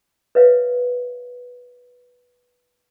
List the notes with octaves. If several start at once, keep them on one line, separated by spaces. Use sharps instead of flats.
B4 C#5 E5 F5